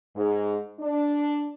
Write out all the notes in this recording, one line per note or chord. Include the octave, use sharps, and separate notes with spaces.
G#2
D4